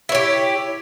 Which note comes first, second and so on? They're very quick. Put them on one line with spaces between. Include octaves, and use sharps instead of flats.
E4 C#5 G4